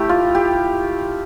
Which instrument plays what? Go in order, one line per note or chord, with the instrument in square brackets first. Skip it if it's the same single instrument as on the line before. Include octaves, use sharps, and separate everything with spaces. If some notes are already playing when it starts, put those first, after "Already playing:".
Already playing: [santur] A3 E4 G4
F4
G4